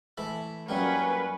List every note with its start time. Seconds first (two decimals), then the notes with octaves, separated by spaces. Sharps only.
0.17 E3 A3 B5
0.69 F#2 G3 A#3 C#4 B4